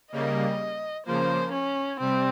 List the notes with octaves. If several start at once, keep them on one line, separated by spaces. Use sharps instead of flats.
C#3 G3 A#3 D#5
C#3 F3 A#3 C5
C#4
C3 G3 C4